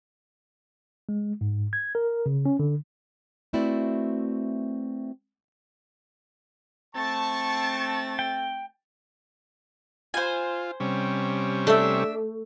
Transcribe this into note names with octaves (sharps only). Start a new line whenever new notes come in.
G#3
G#2
G#6
A#4
C#3
C#4
D3
A3 C4 E4 F#4 B4 D5
A3 C4 A5 C#6 A6
G5
F4 C5 G#5
C3 G3 C#4
A3 D4 E5